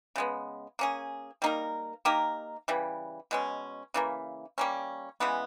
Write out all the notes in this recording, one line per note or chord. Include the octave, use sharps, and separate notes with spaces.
C#3 G#3 B3
A#3 C#4 G#4
G3 A#3 D#4 A#4
A#3 D#4 G4 A#4
C#3 E3 G3
B2 G#3 C#4
C#3 E3 A#3
G3 A#3 C#4
C#3 E3 G#3 B3